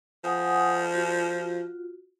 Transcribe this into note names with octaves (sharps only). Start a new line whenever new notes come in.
F3 F#5 G#5 D#6
F4 F#4